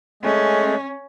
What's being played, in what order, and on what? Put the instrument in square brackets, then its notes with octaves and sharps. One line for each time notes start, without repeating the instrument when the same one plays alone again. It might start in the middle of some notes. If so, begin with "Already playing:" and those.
[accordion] G#3 A3 [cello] C#4